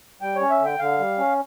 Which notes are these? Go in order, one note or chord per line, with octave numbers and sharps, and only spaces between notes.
G3 G5
C#5
C#4
E5
D3
G5
D3 F5
G3
C#4